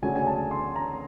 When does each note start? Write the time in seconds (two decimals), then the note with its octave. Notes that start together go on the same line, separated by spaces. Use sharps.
0.02 D2 C#3 F#3 A3 D4 G#5
0.16 G#5
0.27 A5
0.51 C6
0.76 A#5